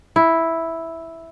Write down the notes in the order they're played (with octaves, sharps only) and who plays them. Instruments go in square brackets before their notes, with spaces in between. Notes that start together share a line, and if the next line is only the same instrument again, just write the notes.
[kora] E4